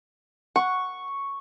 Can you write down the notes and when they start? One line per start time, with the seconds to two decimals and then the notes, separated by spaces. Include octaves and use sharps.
0.56 F#5 C#6